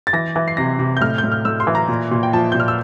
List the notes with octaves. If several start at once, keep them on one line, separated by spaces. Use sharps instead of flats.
A6
E3 A#6
E3
C7
C3 A#6
C3
G6
A2 F6
G6
A2
F6
A2 E6
C6
E3
A#5
A#2
A#2
G5
F3 A5
A#2 G6
F6
E6